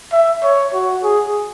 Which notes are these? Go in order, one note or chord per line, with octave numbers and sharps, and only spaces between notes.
E5
C#5
F#4
G#4